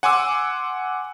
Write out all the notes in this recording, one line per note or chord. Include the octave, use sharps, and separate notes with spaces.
F#5 G#5 C6 D6 E6